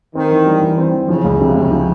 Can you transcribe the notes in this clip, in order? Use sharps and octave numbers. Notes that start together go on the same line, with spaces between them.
D#3 C4
E3
G3
E3
C4
E3
C#3 F3
C#2
C3
C#2 C#3
F3